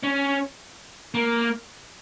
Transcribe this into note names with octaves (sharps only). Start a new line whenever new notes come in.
C#4
A#3